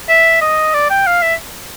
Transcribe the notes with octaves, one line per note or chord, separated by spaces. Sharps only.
E5
D#5
D5
G5
F5
E5